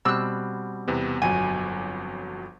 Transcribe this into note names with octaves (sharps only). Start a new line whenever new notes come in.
B2 G3 C4 E6 F#6
E2 C3 B3
G1 F2 F#3 G#5